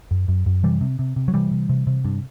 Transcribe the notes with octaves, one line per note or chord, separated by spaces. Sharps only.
F#2
F#2
F#2
C3 E3 G3
C3
C3
C3
F#3
C3 E3 G3
C3
C3
C3
G2